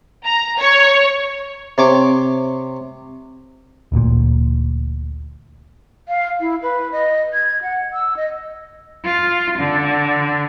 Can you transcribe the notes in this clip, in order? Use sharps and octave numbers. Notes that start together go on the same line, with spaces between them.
A#5
C#5
C3 C#5 D6
D#1 A1 D2 A#2
F5
E4
B4
D#5
G#6
F#5
E6
D#5
F4
D3